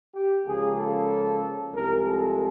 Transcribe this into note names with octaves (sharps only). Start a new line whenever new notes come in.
G4
C#2 C#3 F3 A#3 G#4
A4
C2 C3 F3 G#3 A#4
A4